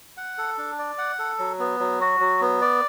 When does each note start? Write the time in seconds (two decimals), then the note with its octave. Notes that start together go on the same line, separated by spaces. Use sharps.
0.17 F#5
0.38 A4
0.58 D4
0.79 D5
0.98 F#5
1.19 A4
1.39 F#3
1.59 B3
1.80 F#3
2.01 F#4
2.20 F#3
2.41 B3
2.61 D5